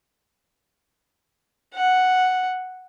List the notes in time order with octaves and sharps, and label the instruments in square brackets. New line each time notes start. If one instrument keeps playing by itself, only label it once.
[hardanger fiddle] F#5